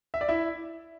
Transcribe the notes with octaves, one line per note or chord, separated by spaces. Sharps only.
E5
D5
E4 E5